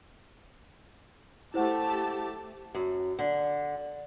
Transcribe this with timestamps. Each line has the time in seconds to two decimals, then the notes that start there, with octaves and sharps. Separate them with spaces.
1.54 A3 E4 G4 C5 F#5 A5
2.75 F#2
3.19 D3